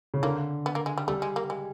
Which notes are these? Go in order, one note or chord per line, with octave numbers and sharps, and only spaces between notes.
C#3
D3 A#3
B3
A#3
G#3
G3
G3 A3
G#3
A#3
G#3